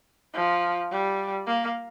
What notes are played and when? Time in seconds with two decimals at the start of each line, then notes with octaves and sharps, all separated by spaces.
0.34 F3
0.91 G3
1.47 A#3